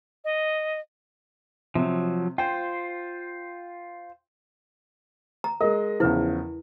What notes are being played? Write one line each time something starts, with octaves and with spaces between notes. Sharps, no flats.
D#5
C3 F3 F#3
F4 C5 G5
A#5
G#3 A#4 D#5
E2 C#3 F3 E4 B4